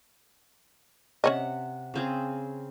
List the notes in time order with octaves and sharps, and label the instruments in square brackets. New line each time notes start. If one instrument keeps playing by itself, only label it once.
[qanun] C3 F#5 [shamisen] C#4 C#5 D#5
[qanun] C#3 C4 G#4